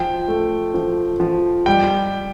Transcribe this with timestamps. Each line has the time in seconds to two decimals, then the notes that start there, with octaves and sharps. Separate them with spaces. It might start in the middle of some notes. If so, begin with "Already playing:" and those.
Already playing: F3 G5
0.28 A3
0.74 F3
1.20 F3
1.66 G3 G5